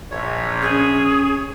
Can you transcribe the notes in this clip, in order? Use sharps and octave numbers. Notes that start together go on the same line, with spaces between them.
A#1 C#5
C#4 G#4